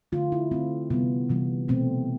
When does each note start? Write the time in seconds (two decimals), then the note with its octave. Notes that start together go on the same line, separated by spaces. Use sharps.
0.12 D3 A3 F4
0.32 E4
0.51 D3 A3 C4
0.90 C3 E3 G3 B3
1.29 C3 E3 G3
1.68 B2 A3 C4